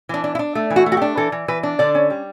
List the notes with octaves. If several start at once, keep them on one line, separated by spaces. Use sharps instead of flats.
E3 D4
D4
E4
D4
A3
E3
F#4
A3
F#4
G4
D4
E3 A4
E3
E3 B4
D4
D3 D5
C#4
G3